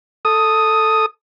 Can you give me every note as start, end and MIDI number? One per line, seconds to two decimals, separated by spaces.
0.25 1.06 69
0.25 1.06 87